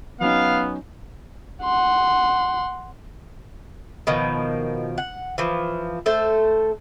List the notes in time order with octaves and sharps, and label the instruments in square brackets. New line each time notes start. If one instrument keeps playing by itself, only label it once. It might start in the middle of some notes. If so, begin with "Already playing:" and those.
[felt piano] F#3 C#4 D#4 [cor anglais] B3 [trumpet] F5
[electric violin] F#5 C6
[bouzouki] B2 D#3 F3
F#5
E3 F3
A3 A4 C5